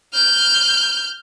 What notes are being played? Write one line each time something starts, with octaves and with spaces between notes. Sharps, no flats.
F6 G6